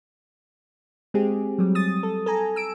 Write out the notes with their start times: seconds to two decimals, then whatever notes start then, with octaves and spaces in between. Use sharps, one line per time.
1.14 G#3 C4 G4 G#4
1.59 F#3 G3
1.75 D#6 A6
2.03 A4
2.26 A4 G#5 A#5
2.56 E6 D7